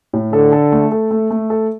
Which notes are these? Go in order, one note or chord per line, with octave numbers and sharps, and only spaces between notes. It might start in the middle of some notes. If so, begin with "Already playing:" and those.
A2
D3 A4
A4
A3
A4
A3
A3
A4